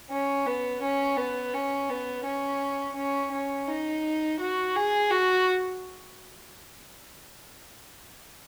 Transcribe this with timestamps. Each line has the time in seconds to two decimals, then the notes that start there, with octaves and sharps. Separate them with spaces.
0.10 C#4
0.46 B3
0.81 C#4
1.17 B3
1.53 C#4
1.89 B3
2.24 C#4
2.96 C#4
3.31 C#4
3.67 D#4
4.40 F#4
4.76 G#4
5.10 F#4